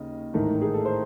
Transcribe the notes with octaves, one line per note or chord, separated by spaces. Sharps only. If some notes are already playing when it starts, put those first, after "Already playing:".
Already playing: D#2 C#3 D#5
A1 G#2 D#3 A3 D#4
G#4
A4
C5